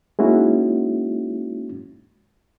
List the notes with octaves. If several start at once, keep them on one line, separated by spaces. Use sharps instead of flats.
G#3 A#3 C#4 D#4 E4 F#4